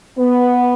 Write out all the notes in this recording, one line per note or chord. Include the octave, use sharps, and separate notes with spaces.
B3